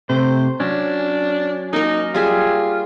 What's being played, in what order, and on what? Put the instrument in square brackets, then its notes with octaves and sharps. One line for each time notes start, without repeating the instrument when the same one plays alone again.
[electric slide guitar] C3 A3 [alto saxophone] C5
[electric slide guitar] F#3 C#4 [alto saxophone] D4
[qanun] A#3 A#4 [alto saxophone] D#4
[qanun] G3 G#4 E5 [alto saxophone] F4